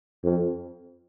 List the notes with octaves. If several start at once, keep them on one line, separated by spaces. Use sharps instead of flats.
F2